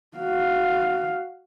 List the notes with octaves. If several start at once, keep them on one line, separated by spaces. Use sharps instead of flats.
F#4 F5